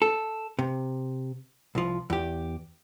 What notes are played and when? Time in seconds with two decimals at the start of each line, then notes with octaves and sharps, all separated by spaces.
0.02 A4
0.59 C3
1.75 C2 F3
2.10 E2 G4